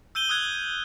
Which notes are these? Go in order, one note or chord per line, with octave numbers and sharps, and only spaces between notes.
E6 G6 D#7 G7
D#6 E6 F#6 G#6